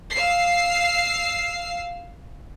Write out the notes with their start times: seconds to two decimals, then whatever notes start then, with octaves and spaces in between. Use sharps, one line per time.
0.13 F5 E6 C7